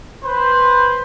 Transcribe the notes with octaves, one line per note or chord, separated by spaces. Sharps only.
B4 C5